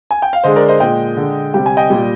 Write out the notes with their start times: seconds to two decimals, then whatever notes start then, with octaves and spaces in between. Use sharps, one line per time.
0.11 G#5
0.22 G5
0.33 F5
0.44 D3 G#3 C5 D#5
0.56 A#4 D5
0.68 C5 D#5
0.80 A#2 G#3 D#5 G5
1.17 D3 G#3
1.54 C3 G3 G5
1.66 G#5
1.77 D#5 G5
1.90 A#2 G3